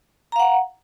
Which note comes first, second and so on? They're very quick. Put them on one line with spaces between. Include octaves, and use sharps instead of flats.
A#5 F5 F#5